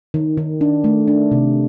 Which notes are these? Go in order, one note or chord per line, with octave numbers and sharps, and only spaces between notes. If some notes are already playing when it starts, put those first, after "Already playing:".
D#3
D#3
D4
A3
D4
C3